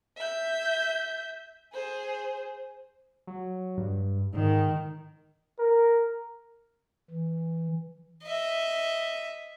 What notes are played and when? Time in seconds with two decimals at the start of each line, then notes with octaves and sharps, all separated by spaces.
0.17 E5 G6
1.73 G#4 C5
3.27 F#3
3.78 G2
4.34 G#2 D#3
5.59 A#4
7.11 E3
8.24 D#5 E5